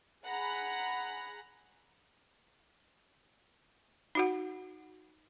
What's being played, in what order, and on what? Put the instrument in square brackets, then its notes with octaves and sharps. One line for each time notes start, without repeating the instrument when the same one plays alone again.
[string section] G#4 F#5 A#5 B5 F#6
[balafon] D#4 F#4 F#5